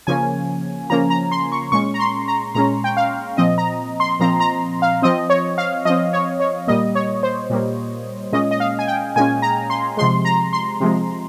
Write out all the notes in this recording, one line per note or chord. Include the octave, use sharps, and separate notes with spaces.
C#3 F3 A#3 C#4 G#5
C#3 F3 A#3 C#4 A#5
A#5
C6
C#6
A#2 G#3 C#4 C#6
A#5
C6
A#5
A#2 G#3 C#4 A#5
G5
F5
A#2 F3 C4 D#5
A#5
C6
A#2 F3 C4 A#5
A#5
F5
F3 C4 D#5
C#5
F5
F3 C4 D#5
C#5
C#5
A#2 G3 A#3 D#5
C#5
C5
A#2 G3 A#3
A#2 G#3 C#4 D#5
D#5
F5
G#5
G5
A#2 G#3 C#4 G#5
A#5
C6
C3 F3 G#3 C6
A#5
C6
C3 F3 G#3